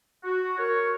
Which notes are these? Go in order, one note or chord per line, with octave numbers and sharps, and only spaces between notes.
F#4
A#4 C#5